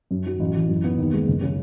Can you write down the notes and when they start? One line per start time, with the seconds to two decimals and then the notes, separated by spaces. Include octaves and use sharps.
0.11 F#2
0.26 F#3
0.40 A1
0.55 E3
0.69 F#2
0.84 B3
0.98 D#2
1.13 G#3
1.28 F#1
1.42 C#3